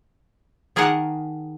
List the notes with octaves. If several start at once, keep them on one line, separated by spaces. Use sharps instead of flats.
D#3 G#4 A#4 D5 F#5 A5